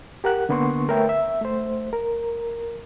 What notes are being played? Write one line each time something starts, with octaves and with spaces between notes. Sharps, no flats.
G4 A#4 F#5 F#6
D3 A#3 B3 D4 C6 C#6
A3 A#4 B4 C#5 E5 G5
E5
A3 C5
A#4